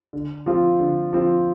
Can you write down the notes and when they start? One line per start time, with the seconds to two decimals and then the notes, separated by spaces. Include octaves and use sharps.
0.13 D3
0.46 F3 C4 F4
0.79 D3
1.13 F3 C4 F4